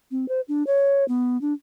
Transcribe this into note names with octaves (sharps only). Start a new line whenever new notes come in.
C4
C5
D4
C#5
B3
D4